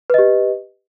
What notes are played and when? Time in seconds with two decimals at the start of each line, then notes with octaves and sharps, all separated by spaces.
0.10 B4
0.14 D#5
0.18 G4